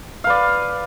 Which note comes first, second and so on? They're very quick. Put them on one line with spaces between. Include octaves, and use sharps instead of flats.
F5 B4 D5